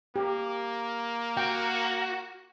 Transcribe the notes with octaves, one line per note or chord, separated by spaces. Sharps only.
A#3 G4
F#4 G5